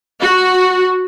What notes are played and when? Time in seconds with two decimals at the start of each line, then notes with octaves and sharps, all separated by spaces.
0.22 F#4